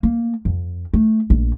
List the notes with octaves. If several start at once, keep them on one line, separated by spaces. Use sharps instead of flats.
A#3
F2
A3
A#1